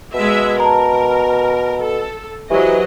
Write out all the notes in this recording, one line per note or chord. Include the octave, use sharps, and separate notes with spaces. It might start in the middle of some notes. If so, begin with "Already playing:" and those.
B2 G#3 E5
A#4 A5 A#5
A4
E3 F#3 G4 B4 C5 D#5